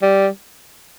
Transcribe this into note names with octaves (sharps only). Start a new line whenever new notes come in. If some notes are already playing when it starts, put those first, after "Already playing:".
G3